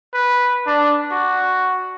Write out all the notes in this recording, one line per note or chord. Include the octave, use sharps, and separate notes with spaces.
B4
D4
F#4